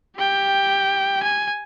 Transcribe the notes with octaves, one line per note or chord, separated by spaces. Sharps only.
G4 G5
G#5